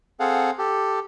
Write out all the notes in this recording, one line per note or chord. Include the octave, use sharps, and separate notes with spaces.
C4 G#4 A4 F5 F#5
G4 A4